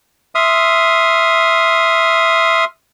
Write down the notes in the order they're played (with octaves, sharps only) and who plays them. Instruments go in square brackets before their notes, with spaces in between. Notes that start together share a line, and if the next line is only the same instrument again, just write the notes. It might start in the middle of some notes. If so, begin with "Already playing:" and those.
[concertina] E5 C6 D#6 F6